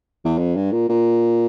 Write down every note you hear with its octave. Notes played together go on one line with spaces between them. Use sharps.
E2
F2
G2
A#2
A#2